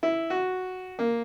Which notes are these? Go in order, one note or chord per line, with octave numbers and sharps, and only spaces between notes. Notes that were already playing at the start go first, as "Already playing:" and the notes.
E4
F#4
A#3